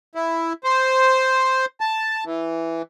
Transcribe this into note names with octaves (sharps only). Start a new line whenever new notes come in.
E4
C5
A5
E3